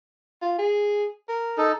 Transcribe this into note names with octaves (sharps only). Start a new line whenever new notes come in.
F4
G#4
A#4
D#4 A4